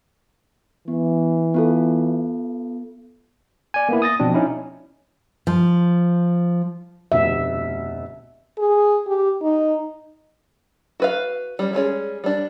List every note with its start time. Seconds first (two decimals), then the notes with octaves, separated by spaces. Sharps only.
0.88 E3 B3
1.54 B3 F4 A4
3.74 D5 G#5
3.89 A#3 B3 E4
4.02 D#6 A6 A#6
4.20 B2 F3 C4 D4
4.34 C#4 D#4 E4
5.47 F3
7.12 F1 D2 B2 E5
8.58 G#4
9.07 G4
9.42 D#4
11.00 F#4 B4 F5
11.59 G3 C#4
11.73 G3 G#3 C#4 G#4
12.24 G3 D4